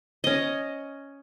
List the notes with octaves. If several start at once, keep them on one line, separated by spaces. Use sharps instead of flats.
C#4 D#5